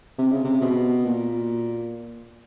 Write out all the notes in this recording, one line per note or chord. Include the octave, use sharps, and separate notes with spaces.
C3
C#3
C3
B2
A#2